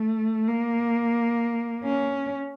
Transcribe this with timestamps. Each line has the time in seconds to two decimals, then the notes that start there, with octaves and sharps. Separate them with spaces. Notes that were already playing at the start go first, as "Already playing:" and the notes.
Already playing: A3
0.47 A#3
1.84 C#4